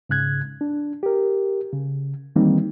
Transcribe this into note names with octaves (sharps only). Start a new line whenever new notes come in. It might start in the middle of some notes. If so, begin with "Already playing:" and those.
G#2 C#3 F#6 G#6
D4
G4 A#4
C#3
D#3 E3 G3 A#3 C4 D#4